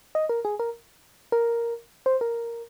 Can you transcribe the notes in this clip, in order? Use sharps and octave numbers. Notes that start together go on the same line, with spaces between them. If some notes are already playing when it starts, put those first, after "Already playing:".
D#5
A#4
G#4
A#4
A#4
C5
A#4